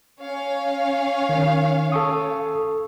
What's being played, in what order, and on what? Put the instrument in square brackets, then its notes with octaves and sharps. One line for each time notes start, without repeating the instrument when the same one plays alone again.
[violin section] C#4 C#5 F5
[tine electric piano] D#3
A4 C#6 D#6